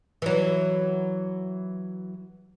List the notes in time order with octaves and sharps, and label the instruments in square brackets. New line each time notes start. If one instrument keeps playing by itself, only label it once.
[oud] E3 F#3